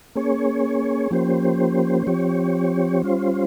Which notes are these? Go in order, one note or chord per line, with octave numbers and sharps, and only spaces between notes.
A#3 C#4 G#4 C#5
F3 A#3 C#4 G4 C5
F3 C4 G4 C#5
G3 C#4 F4 C5